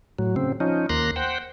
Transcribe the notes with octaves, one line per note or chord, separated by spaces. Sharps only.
A2 F#3
C#3 C4
F3 C#4 D#4
D#2 A#3 A#5 C6 F#6
C5 F#5 G5